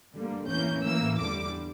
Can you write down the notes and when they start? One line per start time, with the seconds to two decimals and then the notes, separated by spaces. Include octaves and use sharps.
0.14 G2 D3 G3 A#3
0.49 E2 E3 A#3 C#4 G6
0.84 A2 E3 A#3 E6
1.19 E2 D3 G3 D6